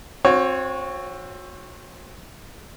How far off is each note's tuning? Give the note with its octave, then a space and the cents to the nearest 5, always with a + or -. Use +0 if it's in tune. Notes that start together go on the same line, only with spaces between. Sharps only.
C4 +20 F#4 -30 C#5 +0